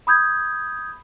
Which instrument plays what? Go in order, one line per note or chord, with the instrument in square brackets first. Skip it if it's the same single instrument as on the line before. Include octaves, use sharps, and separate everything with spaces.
[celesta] B5 D#6 G6 G#6